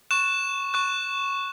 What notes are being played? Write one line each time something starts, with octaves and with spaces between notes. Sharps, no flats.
C#6 F#6 E7
C#6 F#6